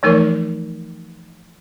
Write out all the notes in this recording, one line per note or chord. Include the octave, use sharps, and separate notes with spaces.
E3 F3 A3 D#4 A#4 C#5